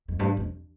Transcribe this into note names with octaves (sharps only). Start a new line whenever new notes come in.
F2
G2
F2